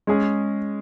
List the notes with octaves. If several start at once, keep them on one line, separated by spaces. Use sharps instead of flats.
G#3 C#4 G#4